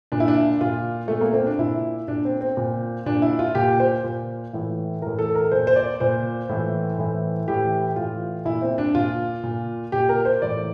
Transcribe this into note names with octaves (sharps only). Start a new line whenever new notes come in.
A#2 D4
E4
D4
A#2 F4
A#2 A3
A#3
C4
D4
A#2 E4
A#2 D4
C4
C4
A#2
A#2 D4
E4
F4
A#2 G4
C5
A#2
A2 E3
A2 E3 A#4
A4
A#4
A#2 C5
C5
D5
A#2 C5
A2 E3
A2 E3
A2 E3 G4
A2 E3 F4
A#2 E4
C4
D4
A#2 F4
A#2
A#2 G4
A#4
C5
A2 E3 D5